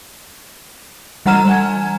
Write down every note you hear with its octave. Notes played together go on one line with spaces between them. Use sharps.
E3 G3 F#5 A#5 F6 E7
G#5 G#6